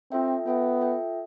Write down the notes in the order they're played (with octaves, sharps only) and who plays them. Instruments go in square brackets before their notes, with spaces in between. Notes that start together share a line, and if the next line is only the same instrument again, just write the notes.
[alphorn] C4 [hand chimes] F4 A4 E5 G5
[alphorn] B3 [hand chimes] F4 A4 E5 G5
[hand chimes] F4 A4 E5 G5